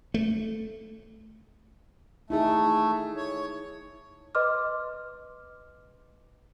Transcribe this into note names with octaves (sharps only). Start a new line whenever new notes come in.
A3
A3 D#4 E4 G#4
C#5
B4 D#5 C6 D6 F6